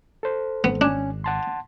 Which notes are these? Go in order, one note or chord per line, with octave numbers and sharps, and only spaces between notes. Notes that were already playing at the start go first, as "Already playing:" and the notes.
A4 C5
G#1 B3
C#4 D4 G#5
F#5 A5 C6